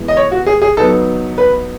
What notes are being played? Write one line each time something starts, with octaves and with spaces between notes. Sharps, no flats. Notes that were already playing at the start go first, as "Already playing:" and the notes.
Already playing: E3 G#3 B3
D#5
C#5
F#4
G#4
G#4
F#3 B3 D#4 A4
B4